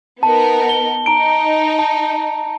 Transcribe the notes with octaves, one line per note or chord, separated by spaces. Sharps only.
B3 D#4 A#4 A5
G7
D#4 A#5 D7
A5